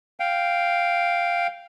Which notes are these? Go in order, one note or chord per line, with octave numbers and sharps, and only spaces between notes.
F5 G5